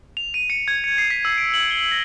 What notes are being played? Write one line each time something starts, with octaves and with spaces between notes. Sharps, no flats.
F7
D#7
C#7
G#6
C#7
C7
B6
E6
D7
F#7
G7
A#6